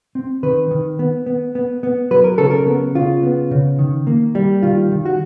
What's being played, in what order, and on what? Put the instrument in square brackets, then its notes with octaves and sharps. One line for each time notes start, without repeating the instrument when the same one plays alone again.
[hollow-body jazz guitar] C4
D#3 B4
D#3
B3
B3
B3
B3
F#3 B4
A#4
C#3 A4
A#4
B3
C#3 F4
B3
C#3
D#3
A#3
G3
D#3 F4
D#3
F#4